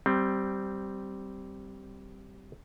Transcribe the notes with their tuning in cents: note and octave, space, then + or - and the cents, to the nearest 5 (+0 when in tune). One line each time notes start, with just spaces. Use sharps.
G3 -10 C4 +0